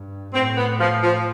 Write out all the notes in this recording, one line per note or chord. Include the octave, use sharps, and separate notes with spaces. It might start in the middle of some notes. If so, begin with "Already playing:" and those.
Already playing: G2
A2 C4
B3
F3
F3